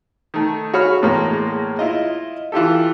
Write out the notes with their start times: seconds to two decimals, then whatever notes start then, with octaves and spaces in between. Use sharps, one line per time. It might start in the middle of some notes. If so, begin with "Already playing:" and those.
0.34 D#3 A3
0.74 F#4 G#4 C#5 F5 B5 F6
1.02 E2 A2 G#3 A#3
1.79 E4 F4 D#5
2.52 E3 F4 G4 A4